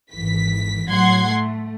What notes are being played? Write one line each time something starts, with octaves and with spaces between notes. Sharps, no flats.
G#1 E3 B6
A2 F#3 F#5 C6 G#6
A3